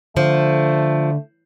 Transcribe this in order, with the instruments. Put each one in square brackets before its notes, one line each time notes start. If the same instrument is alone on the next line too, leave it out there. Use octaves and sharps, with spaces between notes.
[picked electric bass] D3 [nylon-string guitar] F3 [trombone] A3